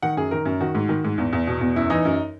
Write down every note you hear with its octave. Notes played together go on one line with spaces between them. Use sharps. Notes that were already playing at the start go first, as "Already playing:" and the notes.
D#3 F#5
F#2 G#4
D#3 A#4
F#2
D#3 F#4
G#2
D#3
G#2
E2
E2
B2
E2
F#2 E4
E3 D#4
F#2